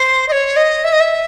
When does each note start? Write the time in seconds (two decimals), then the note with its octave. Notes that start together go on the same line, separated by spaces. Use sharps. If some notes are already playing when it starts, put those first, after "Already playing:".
Already playing: C5
0.28 D#5
0.32 C#5
0.56 D#5
0.84 E5
0.92 D#5
1.00 E5